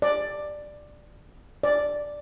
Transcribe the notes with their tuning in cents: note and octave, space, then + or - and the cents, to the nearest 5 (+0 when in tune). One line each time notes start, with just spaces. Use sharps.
D5 +10
D5 +0